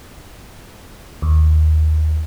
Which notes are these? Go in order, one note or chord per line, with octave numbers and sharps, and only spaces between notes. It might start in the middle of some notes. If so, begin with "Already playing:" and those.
D#2